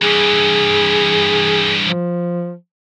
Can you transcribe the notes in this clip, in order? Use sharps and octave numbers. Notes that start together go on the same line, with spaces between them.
G2 E3 G#4
F3